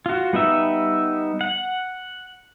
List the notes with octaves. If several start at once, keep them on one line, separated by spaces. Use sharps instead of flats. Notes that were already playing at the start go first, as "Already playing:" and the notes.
F4 F#4
G3 B3 D#4 E5
F#5